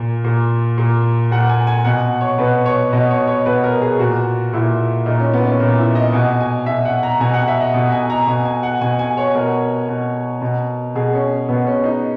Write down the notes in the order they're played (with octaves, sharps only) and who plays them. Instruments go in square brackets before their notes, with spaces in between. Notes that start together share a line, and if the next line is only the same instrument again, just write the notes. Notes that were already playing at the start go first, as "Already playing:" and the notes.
Already playing: [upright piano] A#2
A#2
A#2
A#2 F#5
G#5
G#5
B2 F#5
C#5
B2 B4
C#5
B2 D#5
C#5
C#5
B2 B4
A#4
G#4
A#2 F#4
A#2 E4
A#2 D#4
C#4
B3
C#4
A#2 C#4
E4
D#5
B2 G#5
G#5
B2 E5
F#5
A#5
B2 G#5
F#5
E5
D#5
B2
G#5
A#5
B2 G#5
G#5
F#5
B2 G#5
G#5
C#5
B2 A#4
B2
B2
B2 G#4
C#4
B2 B3
C#4
D#4